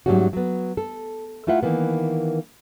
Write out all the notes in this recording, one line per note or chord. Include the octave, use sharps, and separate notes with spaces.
G#2 F#3 G3 A3 C#4 F#4
F#3 B3
A4
A3 E4 F4 E5 F#5
D#3 E3 A#3 B3